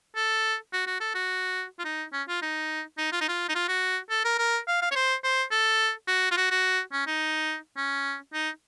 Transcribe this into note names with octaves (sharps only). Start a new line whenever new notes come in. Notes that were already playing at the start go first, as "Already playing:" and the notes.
A4
F#4
F#4
A4
F#4
F4
D#4
C#4
F4
D#4
D#4
F4
D#4
F4
D#4
F4
F#4
A4
A#4
A#4
F5
F5
C#5
C5
C5
A4
F#4
F4
F#4
F#4
C#4
D#4
C#4
D#4